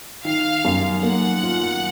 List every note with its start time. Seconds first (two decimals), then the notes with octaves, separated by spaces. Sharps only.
0.25 D#3 F5
0.65 F#2
1.03 A#3 F#5
1.43 F4